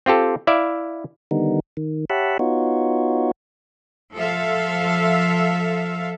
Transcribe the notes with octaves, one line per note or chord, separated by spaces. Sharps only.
C4 F4 G4 A4
E4 D5 E5 F5
D3 D#3 G3 B3 D#4
D#3
G4 C#5 E5 F#5 A5 B5
B3 D#4 F4 F#4 C#5
F3 A4 E5 F5